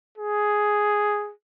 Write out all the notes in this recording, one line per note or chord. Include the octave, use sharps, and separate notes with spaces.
G#4